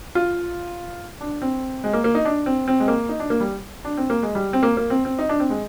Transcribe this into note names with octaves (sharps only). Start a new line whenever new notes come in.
F4
D4
C4
G#3
A#3
A#3
D#4
D4
C4
C4
G#3
A#3
D#4
D4
A#3
G3
D4
C4
A#3
G#3
G3
C4
A#3
A#3
C4
C4
D#4
D4
C4
G#3